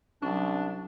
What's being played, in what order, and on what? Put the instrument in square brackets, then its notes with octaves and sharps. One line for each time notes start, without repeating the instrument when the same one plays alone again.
[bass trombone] C2 [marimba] F#3 C#4 [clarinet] D4